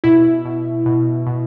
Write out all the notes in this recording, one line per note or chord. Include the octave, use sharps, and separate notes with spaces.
B2 E4
B2
B2
B2